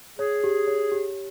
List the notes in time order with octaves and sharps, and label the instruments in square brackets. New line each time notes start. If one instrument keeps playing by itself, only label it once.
[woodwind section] G#4 [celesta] C#5
[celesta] G4
C#5
G4